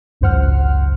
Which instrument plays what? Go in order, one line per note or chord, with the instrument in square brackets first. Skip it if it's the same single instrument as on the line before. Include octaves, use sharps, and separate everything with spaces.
[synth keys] G#1 C#2 F#2 C5 F#5 F6